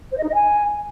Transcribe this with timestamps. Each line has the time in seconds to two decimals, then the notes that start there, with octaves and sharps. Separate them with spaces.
0.11 C5
0.17 D#5
0.23 D#4
0.28 D#5
0.34 G#5